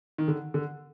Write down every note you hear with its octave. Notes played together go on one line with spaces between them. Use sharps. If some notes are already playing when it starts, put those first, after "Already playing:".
D#3
D3
D3